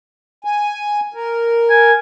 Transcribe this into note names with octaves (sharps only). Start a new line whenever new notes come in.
G#5
A#4
G#5